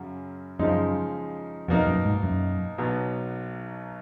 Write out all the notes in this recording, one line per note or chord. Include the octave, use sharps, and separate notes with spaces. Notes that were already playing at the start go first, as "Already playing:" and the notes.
Already playing: F#2 C#3 F#3
F#2 C#3 F3 G#3 D#4
F2 B2 A#3 D#4 A#4
F#2
G#2
F#2
B1 B2 F#3 B3